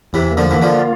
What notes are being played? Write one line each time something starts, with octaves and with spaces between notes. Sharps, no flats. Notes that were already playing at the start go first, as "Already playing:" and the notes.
E2 C3 E3
A#3
D3 F3
E3 A#3
D3 F3
F4